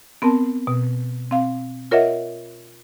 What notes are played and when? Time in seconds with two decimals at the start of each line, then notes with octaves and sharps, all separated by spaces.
0.22 B3 C4 A#4 A5
0.67 B2
1.31 C4 F5
1.91 F4 A#4 C#5 D#5 E5 F#5